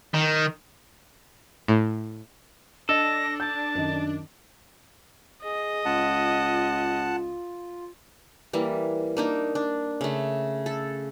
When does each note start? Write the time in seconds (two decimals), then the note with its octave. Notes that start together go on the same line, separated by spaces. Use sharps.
0.14 D#3
1.68 A2
2.89 D4 A4 D#5 A#6
3.40 A5 G6
3.75 F#2 D#3 D#5
5.43 G#4 D#5
5.85 C#2 F4 F#5 A5
8.53 E3 G3 A#3
9.17 A#3 D4 D#4
9.55 D4
10.01 C#3 A3
10.66 A4